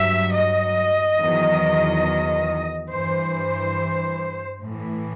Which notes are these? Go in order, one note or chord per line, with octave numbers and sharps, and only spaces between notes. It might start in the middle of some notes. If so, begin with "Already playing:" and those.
Already playing: G2 F#3 E5
D#5
E2 D#3 F#3
G2 E3 C5
A2 E3